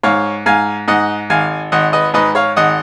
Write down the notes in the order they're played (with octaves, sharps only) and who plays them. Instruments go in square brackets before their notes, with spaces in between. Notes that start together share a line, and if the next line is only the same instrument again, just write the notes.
[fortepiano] G#2 C#5 F5
G#2 F5 G#5
G#2 D#5 F#5
G#1 F5 G#5
G#1 D#5 F#5
B4 D#5
G#2 B4 D#5
C#5 F5
G#1 D#5 F#5